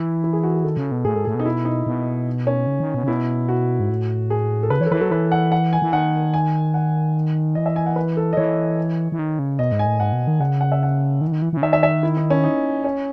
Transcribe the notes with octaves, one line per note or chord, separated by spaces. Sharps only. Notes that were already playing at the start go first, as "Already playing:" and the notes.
Already playing: E3 E4
E4
G#4
F#4
G#4
D#3 A4
C#3
B2
A2 G#4
G#2 A4
A2 G#4
B2 D#4
E4
D#4
B2
C#4
C#3
D#3
B2
C#3
B2 E4
F#4
G#2
A2
G#4
A4
C#3 B4
E3 C#5
A4
E3 B4
F#3 A4
E3 B4
F#5
F#5
G#5
E3
D#3 F#5
G#5
F#5
E3 D#5
E5
G#5
F#5
B4
A4
D#5
E3 C#5
E3
D#3
C#3
B2 D#5
G#2
G#5
A2
G#2 F#5
B2
D#3
C#3 F#5
F#5
E5
F#5
D#3
E3
D#3
E3
E3
C#3
D#3 E5
E5
E5
E4
D#4
C#4
D#4
C#4